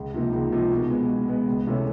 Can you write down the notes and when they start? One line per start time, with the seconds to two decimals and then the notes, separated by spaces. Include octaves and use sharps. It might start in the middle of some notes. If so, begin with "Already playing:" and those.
Already playing: C#2
0.14 C3 F3 A#3 D#4
0.33 C#2
0.52 C3 F3 A#3 D#4
0.71 B2
0.90 G#3 B3
1.09 B2
1.28 G#3 B3
1.47 C#2
1.67 C3 E3 A3 C#4